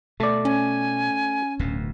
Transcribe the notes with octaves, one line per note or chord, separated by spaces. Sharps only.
B2 A3 D5
C#4 G#5
D1 D2 B2